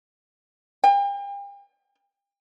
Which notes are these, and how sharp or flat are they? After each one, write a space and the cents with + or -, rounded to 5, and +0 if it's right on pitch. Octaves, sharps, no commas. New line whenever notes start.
G5 +40